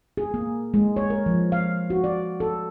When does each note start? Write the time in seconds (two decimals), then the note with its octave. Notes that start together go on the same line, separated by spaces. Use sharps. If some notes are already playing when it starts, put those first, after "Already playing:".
0.17 G#4
0.34 A#3
0.74 G#3
0.96 C#5
1.10 A#4
1.26 F3
1.52 F5
1.90 F#4
2.04 D5
2.40 A4